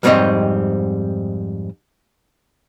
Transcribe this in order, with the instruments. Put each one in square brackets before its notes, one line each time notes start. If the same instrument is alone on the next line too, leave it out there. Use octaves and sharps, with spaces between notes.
[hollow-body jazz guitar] F2 G#2 G3 C4 C#5 D#5